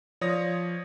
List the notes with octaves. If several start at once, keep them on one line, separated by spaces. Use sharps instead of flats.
F3 C#5 D5 D#6 A#6